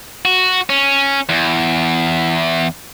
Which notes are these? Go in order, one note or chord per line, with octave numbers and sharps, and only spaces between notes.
F#4
C#4
E2